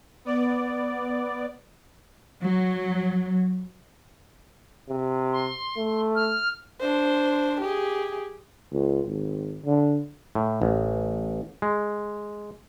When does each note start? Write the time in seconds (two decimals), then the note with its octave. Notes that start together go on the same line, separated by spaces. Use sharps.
0.25 B3 D5
2.43 F#3
4.89 C3
5.32 C6
5.77 A3
6.15 F6
6.80 D4 C5
7.61 G4 G#4
8.73 C#2
9.06 G#1
9.64 D3
10.35 A2
10.62 A1
11.62 G#3